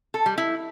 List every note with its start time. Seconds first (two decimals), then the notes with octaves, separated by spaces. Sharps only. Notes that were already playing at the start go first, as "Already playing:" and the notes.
0.14 A4
0.26 G3
0.38 E4